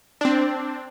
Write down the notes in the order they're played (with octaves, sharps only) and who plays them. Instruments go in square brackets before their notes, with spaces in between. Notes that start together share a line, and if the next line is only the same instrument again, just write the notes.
[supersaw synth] C4 D4